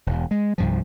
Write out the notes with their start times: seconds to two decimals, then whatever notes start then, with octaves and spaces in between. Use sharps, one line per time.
0.07 E1 E2
0.31 G#3
0.58 C2 G2 F3